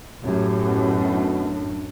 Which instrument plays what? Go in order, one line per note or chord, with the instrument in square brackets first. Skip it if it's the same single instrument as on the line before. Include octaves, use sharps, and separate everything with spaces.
[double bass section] F#2 A2 [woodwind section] G4
[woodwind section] B2
D4